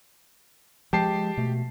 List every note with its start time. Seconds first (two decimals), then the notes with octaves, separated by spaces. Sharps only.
0.93 F3 G#3 G4 A5 C7
1.37 B2 A3